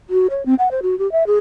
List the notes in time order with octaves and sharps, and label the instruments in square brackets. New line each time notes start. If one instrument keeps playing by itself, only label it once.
[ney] F#4
C#5
C4
F#5
C5
F#4
G4
E5
G#4